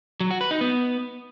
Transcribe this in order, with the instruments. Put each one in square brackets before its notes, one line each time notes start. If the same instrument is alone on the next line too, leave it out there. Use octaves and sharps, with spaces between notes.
[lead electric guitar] F#3
F#4
B4
D#4
B3